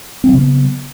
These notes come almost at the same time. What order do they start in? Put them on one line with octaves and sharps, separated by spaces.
C4 F#3 C#3 B3